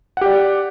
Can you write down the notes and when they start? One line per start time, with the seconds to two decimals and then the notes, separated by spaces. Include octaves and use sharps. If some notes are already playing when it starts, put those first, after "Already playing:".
0.17 F#5
0.21 G4
0.26 D5